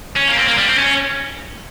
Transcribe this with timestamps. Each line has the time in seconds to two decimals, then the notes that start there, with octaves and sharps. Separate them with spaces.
0.16 C#4
0.27 A#3
0.37 C4
0.47 A#3
0.57 G3
0.68 C4
0.78 C#4